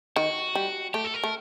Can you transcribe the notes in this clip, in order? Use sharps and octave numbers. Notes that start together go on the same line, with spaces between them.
D#3 F#4
G3
A3 G4
A4
A#4
A3